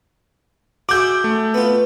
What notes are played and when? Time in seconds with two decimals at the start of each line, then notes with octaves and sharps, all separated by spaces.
0.89 F#4 G#4 E5 D6 G6
1.24 A3
1.54 B3 F4